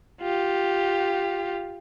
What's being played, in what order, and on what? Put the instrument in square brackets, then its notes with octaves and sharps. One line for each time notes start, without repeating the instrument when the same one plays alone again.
[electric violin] F4 G4